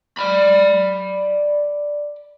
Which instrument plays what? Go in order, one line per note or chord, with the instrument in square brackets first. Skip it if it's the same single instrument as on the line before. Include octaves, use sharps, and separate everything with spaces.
[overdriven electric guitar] D5 B5